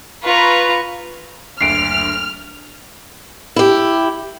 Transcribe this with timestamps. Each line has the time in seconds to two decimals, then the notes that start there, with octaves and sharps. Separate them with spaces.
0.24 F4 B4 A#5 C#6
1.61 F#1 D2 D4 F6 C7 D7
3.56 E4 G4